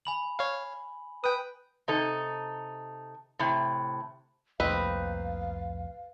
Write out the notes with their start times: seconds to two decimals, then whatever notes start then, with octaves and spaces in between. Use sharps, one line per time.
0.05 G#5 B5 F#7
0.39 C#5 F5
1.24 B4 G5 D#6
1.88 C3 D#4 A4
3.39 A2 C3
4.60 C2 F2 A2 A#3 C4 D#4 B4 F5